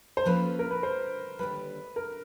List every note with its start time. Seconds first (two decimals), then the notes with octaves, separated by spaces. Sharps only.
0.17 C5
0.26 F3 A#3 C#4 F4 A4 B4
0.59 A#4
0.71 B4
0.83 C5
1.39 D#2 D3 G3 B4
1.96 A#4